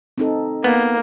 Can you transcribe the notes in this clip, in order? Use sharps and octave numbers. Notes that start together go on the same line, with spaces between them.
C4 D#4 A4
A#3 B3